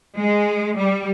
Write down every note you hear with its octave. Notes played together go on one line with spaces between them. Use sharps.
G#3
G3